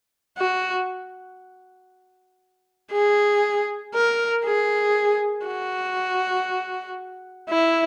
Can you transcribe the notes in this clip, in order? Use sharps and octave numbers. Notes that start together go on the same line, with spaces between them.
F#4
G#4
A#4
G#4
F#4
E4